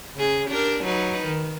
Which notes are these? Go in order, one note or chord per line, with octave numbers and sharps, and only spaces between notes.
C#3 G#4
D4 G4 A#4
F#3 D#4 B4
D#3